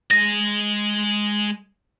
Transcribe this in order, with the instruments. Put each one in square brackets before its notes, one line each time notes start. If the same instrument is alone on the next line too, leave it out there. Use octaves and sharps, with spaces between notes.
[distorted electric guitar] G#3 D#5 [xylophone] A#6